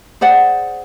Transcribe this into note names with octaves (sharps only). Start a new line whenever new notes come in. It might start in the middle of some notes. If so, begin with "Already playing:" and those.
G#4 C5 D5 F#5